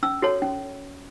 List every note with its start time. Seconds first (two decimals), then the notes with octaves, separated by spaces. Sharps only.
0.03 C#4 E6
0.22 F#4 A4 C#5
0.42 C#4